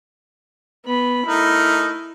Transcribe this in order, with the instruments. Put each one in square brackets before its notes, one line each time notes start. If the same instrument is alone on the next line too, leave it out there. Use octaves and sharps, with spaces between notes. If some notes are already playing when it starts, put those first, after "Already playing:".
[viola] B3 B5
[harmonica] A3 D#4 A#4 [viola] E4